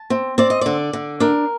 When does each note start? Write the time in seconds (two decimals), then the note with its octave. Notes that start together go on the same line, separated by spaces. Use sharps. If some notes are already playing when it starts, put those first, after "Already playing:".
Already playing: A5
0.10 C4
0.38 C4 D5
0.50 D#5
0.61 D3 D5
0.93 D3
1.20 D4 A#4